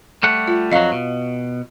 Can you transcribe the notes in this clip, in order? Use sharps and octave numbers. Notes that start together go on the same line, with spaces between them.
G3 A3 F#5
F4
F2 F#3 D#5 F5
B2